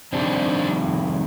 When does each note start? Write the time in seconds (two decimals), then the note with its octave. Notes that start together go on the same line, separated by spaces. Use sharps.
0.13 F2 C3 D#3 G3 C4 D4